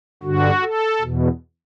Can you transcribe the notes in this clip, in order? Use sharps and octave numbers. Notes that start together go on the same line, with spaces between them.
G2 D3 F#4
A4
E2 B2